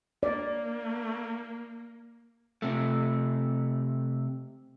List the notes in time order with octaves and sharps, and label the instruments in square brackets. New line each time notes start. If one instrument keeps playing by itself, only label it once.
[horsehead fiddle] A#3 [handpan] D5
[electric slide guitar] C3 A3